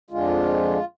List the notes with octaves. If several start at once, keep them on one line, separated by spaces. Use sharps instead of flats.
F2 D3 G#3 F4